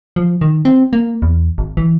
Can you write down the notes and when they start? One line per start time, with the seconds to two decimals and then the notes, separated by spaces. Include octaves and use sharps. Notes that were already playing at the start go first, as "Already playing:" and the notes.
0.16 F3
0.41 D#3
0.65 C4
0.93 A#3
1.22 E2
1.58 G#1
1.77 E3